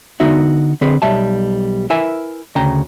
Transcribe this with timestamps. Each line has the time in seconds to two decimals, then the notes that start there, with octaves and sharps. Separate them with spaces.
0.20 D3 B3 D#4 F#4 E5
0.81 D3 C4 G#4 B4
1.02 B1 G3 E5 A5
1.90 E4 A#4 B4 E5 G#5
2.56 D2 C#3 G5 A#5